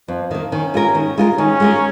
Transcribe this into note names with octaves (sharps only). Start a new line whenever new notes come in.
F2 F3
D#3 A#3
D#3 C#4
G#3 F4 A#4
D#3
G#3 F4 A#4
D#3 C#4
G#3 F4 A#4